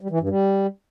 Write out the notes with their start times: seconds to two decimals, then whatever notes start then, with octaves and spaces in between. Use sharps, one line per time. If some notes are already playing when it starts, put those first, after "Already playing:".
0.01 G3
0.10 E3
0.20 G2
0.29 G3